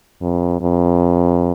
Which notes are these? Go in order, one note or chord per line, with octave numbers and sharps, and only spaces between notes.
F2
F2